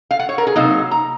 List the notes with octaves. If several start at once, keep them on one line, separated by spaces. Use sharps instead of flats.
F5
F#5
C#5
A#4
G#4
C3 F#3 A#3 D#4 F5
A#5